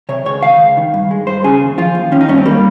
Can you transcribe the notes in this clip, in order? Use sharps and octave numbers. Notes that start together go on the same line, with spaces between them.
C3 C#5
C#2 C#5
D#3 F5
C#2
D#3
G2
G#3
G2 C5
C#3 G#4
D#2
F3 F4
D#2
D#3 C#4
D#4
G2 C#4
C4
G3 A#3